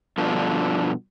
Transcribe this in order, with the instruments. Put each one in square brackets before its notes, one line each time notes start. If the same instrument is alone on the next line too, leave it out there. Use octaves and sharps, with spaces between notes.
[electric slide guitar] G2 B2 D3 F3